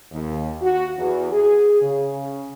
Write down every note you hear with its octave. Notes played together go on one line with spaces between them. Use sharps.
D#2
F#4
E2
G#4
C#3